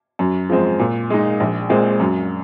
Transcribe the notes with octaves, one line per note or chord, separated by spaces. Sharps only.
F#2
F3 G#3 C4
A#2
G#3 D#4
A#1
A#2 G#3 C4
F#2